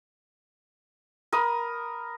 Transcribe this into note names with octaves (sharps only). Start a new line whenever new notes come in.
A#4 B5 D#6